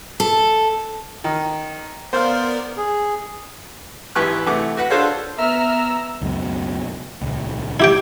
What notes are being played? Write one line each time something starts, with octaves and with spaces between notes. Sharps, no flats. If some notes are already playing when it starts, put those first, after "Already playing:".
A4
D#3
B3 A#4 C5 D5 F5
G#4
G#1 E3 G4 B4 C#6 F#6
C3 E3 A3 F#5 D6 F#6
F#4 B4 F#5
D4 F4 A4 C5 C#5 F5
B3 E5 A#5 E6 F6
C#2 F#2 B2
D#1 C#2
E4 G4 G5